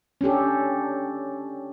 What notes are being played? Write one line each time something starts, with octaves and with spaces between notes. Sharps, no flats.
C#4 D4 G4 A4